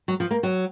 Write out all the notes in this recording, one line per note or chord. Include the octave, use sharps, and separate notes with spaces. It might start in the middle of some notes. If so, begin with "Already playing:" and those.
F#3
F3
A#3
F#3